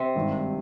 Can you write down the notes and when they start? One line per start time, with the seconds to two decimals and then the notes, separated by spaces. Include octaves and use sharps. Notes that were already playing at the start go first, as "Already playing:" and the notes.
Already playing: C3
0.15 G#1 G2 D#3